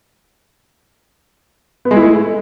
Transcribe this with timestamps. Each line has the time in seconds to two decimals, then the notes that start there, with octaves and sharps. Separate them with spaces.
1.85 B3
1.91 G#3
1.96 E4
2.02 A3